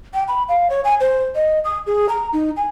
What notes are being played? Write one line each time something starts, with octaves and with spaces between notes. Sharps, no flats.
G5
B5
F5
C#5
G#5
C5
D#5
D#6
G#4
A#5
D#4
G#5